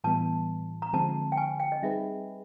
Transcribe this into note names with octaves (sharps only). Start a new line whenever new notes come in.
A2 E3 G3 B3 A5
A#5
D3 F3 G#3 C4 A5
G5
G#5
G5
D#5
G3 C4 D#4 G#4 B4 E5